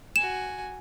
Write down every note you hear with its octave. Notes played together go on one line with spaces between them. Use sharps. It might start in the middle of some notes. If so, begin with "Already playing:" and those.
F#4 G#5 E7